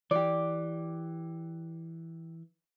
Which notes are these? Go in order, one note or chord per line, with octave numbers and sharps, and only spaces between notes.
E3 G4 D5